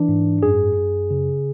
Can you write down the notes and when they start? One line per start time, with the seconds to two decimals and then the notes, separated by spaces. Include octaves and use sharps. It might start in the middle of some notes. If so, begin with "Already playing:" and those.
Already playing: E3 D4
0.08 G#2
0.43 F#2 G#4
0.77 F#2
1.11 C#3